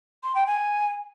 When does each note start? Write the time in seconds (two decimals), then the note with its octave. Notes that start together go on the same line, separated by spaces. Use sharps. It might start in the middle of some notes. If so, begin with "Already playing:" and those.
0.24 C6
0.35 G5
0.47 G#5